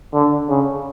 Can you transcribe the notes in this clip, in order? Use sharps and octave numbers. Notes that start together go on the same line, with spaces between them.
D3
C#3